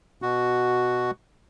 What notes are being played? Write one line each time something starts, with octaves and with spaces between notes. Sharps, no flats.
B2 F#4